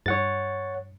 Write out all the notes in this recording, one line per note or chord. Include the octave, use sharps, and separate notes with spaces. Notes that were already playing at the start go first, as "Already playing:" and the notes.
G2 C#5 F#5 A6